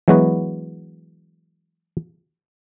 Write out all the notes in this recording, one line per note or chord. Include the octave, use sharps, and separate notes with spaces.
E3 F#3 G#3 B3 F#4 B4